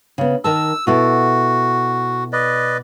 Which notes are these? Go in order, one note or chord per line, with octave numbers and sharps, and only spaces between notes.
C#3 B3
D#3 A#4 A5 E6
B2 E4 F#4 A4
B4 D5 D#5